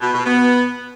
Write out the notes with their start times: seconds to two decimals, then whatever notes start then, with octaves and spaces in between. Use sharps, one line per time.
0.01 B2
0.13 B2
0.25 B3